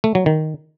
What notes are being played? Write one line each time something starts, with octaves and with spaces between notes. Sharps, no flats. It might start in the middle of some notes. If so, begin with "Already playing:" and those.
A3
F#3
D#3